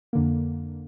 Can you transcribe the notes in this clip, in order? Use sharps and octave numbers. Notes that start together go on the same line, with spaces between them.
F2 D3 A#3